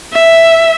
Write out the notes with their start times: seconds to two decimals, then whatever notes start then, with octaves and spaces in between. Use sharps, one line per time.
0.13 E5